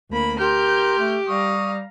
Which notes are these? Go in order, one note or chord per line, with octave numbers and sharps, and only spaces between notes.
D2 A#3 B5
G4 A#4 C6 F6 G6
A3
G3 F5 A#5 C#6 D#6